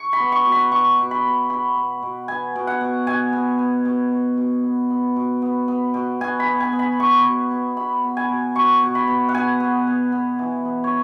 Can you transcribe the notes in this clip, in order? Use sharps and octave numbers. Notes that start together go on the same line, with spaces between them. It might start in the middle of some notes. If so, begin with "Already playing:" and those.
Already playing: C#6
B5
B3
C#6
B2
B5
B2 C#6
B2
B5
B2
B3 B5
B3
B2
B3 G#5
B2
F#5
B2
B2 G#5
B3
B3
B2
B2
B2
B3
B3
B2
B3
B3
B2
B2 G#5
B5
B3
G#5
B3
B5
B3 C#6
B2
B3
B3 B5
B3
G#5
B2
B2 C#6
B2
B5
B2
F#5
B3 G#5
B3
B3
B3
E3
B3
C#5